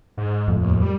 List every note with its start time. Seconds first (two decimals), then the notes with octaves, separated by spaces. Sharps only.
0.17 G#2
0.48 F2 A2
0.61 D#2
0.82 G3